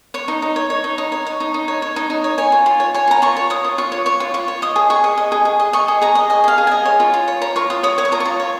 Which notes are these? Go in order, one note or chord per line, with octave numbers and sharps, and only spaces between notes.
C#5 C#6
D#4
D#4
C#5
C#5
D#4
D#4
C#5
C#5
D#4
D#4
C#5
C#5
D#4
D#4
C#5
C#5 G#5
F4
F4
C#5
C#5 G#5
F4 A#5
F4 C#6
C#5
C#5 D#6
F4
F4 C#6
C#5
C#5 C#6
F4
F4 C#6
C#5
D#5 D#6
G#4
G#4 C#6
D#5
D#5
G#4
G#4
D#5
D#5 C#6
G#4
G#4 A#5
D#5
D#5 G#5
G#4 F5
G#4
D#5 G#5
C#5
F4
F4
C#5
C#5 A#5
F4 C#6
F4 D#6
C#5 D#6
C#5 D#6
C#6
F4 A#5
C#6
F4
C#5